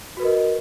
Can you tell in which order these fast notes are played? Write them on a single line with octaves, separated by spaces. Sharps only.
F#4 B4 A#4 D#5